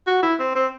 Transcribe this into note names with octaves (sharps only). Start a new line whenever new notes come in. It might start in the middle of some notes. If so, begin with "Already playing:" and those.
F#4
E4
C4
C4